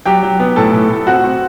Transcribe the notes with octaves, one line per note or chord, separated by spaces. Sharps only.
F#3 G4 G5
F#3
B3
A2 A4 A5
A2
A2
C4 F#4 F#5
C4